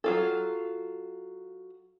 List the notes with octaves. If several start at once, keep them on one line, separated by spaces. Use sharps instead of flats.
F#3 F4 A4